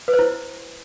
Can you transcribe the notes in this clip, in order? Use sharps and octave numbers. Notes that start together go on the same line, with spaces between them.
B4
C5
E4